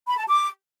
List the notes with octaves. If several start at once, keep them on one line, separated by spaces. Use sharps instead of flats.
B5
A5
D6